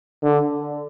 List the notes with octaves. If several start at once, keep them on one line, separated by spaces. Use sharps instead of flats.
D3